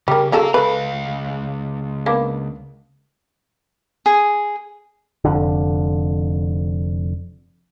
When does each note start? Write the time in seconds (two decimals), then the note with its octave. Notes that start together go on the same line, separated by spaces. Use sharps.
0.08 C#3 G3 A#4
0.32 C#3 F#3 A4 F5 A#5
0.54 C#2 A4 B4 F5
2.06 A#3 B3 D4
4.06 G#4
5.25 F1 F2 D3